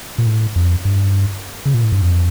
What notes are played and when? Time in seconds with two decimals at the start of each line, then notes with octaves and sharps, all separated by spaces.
0.18 A#2
0.26 A2
0.56 F2
0.85 G2
1.65 C#3
1.74 A#2
1.83 A2
1.92 G2
2.02 F2